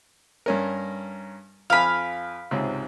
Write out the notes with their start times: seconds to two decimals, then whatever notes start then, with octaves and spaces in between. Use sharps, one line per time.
0.46 G2 C#4 A#4
1.70 F2 F5 G#5 B5
2.51 C#2 G#2 C3